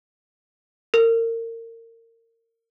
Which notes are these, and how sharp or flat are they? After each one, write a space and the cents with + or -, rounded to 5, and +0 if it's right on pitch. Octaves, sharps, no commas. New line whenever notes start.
A#4 -30